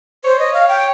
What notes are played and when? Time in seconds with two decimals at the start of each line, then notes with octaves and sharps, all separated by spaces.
0.24 C5 C#5
0.39 D#5
0.53 F5
0.68 G5